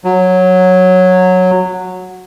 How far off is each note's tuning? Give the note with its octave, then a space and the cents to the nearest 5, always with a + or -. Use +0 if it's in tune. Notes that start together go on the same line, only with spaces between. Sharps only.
F#3 -10